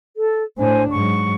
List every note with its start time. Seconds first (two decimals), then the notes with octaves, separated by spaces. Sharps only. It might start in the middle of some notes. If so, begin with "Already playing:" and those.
0.15 A4
0.58 A2 D4 C5 G#5
0.91 G#2 F#3 C#6